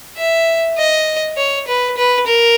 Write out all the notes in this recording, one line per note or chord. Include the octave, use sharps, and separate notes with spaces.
E5
D#5
C#5
B4
B4
A#4